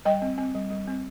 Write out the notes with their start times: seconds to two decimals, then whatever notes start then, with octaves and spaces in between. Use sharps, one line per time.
0.05 G3 D#5 G5
0.22 C4
0.38 C4
0.55 G3
0.70 G3
0.87 C4